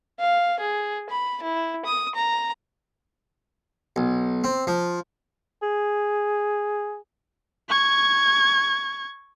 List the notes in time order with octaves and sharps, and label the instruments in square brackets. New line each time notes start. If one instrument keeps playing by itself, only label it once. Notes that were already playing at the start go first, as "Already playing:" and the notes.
[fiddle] F5
G#4
B5
E4
D#6
A#5
[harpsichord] B1
C4
F3
[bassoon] G#4
[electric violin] C#6 G#6